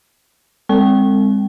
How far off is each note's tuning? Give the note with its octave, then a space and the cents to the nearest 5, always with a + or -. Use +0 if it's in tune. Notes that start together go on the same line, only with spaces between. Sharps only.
G#3 -35 C4 +0 G5 -20